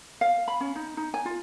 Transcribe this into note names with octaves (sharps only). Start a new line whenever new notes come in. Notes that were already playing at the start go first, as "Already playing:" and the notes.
F5
B5
C#4
D#4
D#4
G#5
F4